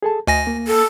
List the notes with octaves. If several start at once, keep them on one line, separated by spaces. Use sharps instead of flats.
G#4 A4 A5
D2 D#5 G#5 A#6
A#3
A4